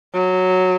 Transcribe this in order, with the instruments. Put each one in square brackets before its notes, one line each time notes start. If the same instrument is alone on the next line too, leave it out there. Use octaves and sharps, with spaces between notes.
[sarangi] F#3